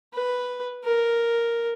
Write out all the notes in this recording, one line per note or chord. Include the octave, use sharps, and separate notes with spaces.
B4
A#4